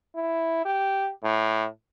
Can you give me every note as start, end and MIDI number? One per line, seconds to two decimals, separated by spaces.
0.16 0.64 64
0.65 1.09 67
1.24 1.66 45